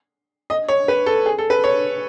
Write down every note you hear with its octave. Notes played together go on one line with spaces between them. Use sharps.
D#5
C#5
B4
A4
G#4
A4
B4
C#5